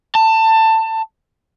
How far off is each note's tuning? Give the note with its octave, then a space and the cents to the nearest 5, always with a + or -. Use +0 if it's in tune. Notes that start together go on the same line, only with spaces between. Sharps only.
A5 +20